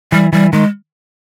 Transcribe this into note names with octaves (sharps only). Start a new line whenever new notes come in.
E3 G3
E3 G3
D#3 G#3